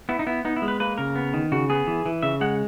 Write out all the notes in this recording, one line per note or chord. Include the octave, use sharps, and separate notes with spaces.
B3 E4
D#4
B3 E4
B3 D#4
E4
G#3
B4
A#3 B4
C#3 A#4
B3
D#3
C#3 F#4
B3 G#4
E3
E3
C#3 E5
G#3 F#5